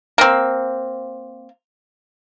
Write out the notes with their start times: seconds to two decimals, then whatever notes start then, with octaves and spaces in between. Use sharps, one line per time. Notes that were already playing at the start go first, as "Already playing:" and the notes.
0.18 A#3 C4